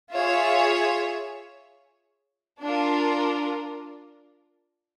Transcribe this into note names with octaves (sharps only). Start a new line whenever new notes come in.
F4 G#4 C#5 E5
D4 F4 A#4